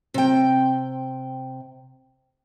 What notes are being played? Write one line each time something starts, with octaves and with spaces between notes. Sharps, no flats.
C3 G5